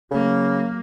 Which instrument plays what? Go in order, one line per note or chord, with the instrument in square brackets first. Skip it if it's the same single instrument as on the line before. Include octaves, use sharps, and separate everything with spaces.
[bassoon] C#3 [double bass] F#3 A#3